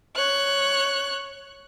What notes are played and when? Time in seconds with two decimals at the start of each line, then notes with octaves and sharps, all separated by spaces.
0.16 C#5 F#6